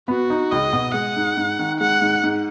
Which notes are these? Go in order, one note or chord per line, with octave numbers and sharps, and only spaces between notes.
B3 F#4
D#4
C#2 D#5
B2
G#3 F#5
G#2
G#2
D#3
G#3 F#5
G#2
G#2